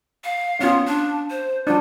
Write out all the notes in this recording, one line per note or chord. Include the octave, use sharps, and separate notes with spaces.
F5
B3 C#4 F4
D4
C5
F#3 D4 F4